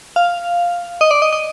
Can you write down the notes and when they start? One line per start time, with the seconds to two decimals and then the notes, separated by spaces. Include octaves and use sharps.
0.16 F5
1.01 D#5
1.11 D5
1.22 D#5
1.33 D#5